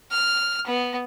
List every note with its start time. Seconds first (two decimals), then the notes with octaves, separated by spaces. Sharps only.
0.11 F6
0.67 B3